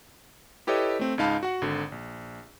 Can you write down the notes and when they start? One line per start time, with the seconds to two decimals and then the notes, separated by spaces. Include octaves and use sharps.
0.67 E4 G4 A4 B4 C#5 D#5
0.99 A3 C4
1.18 C#2 G#2 D#4 F5 A5 B5
1.43 F#4 F#5
1.62 G#1 D3
1.92 A#1